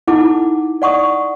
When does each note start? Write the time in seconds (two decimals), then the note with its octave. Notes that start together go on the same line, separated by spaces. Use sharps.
0.07 D#4 E4 A4 F#5 D6
0.82 D5 F#5 C#6 D#6